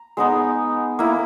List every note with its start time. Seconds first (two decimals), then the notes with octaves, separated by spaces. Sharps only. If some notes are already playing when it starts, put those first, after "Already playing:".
Already playing: A#5
0.17 G#3 B3 D#4
0.99 A#3 E4